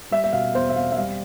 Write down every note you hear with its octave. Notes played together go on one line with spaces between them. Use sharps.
G3 E5
E5
B2 F5
E2 C5
E5
C4 F5
E5
G3 F5